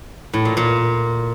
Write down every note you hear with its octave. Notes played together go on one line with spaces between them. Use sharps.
A2
A#2
A#2